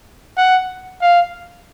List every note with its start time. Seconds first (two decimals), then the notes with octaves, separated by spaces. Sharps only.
0.37 F#5
1.02 F5